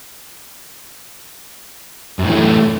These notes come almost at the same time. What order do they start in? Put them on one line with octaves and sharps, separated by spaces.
F#2 A2 E3 A3